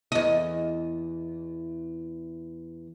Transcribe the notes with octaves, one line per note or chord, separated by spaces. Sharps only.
E2 D#5